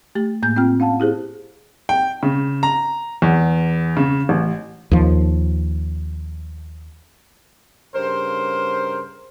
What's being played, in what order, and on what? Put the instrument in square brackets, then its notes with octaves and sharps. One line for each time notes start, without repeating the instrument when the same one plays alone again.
[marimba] A3 G4 A6
A2 A#3 G6
C4 F4 G5 F6
C#4 F5 F#5 A5
E4 G4 G#4 C5
[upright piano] G5
C#3
A#5
E2
C#3
A1
[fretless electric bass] D#2 F3
[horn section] G2 C#3 A#4 C5